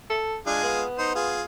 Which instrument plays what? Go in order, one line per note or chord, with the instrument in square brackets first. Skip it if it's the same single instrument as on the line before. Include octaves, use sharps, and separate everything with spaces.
[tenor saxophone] A4
[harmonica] G#3 F4 G#4 [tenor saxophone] D4
[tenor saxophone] B3
[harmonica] D#4 C5
F4 G#4